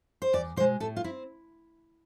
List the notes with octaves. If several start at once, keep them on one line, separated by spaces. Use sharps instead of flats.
C5
E2 D5
B2 G#3 C5
A2 A4
F4
C4 E4